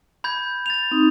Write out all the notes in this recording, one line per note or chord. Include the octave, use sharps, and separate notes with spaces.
B5 G6 G#6
A6 F7
C4 D#4